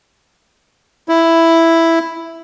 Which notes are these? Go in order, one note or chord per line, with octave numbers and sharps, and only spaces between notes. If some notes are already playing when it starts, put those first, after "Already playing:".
E4